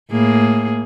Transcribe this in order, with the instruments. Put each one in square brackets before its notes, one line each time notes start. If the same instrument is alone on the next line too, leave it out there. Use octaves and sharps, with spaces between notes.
[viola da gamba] A2 A#3 G#4